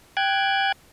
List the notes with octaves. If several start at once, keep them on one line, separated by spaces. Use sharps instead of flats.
G5 F#6 G#6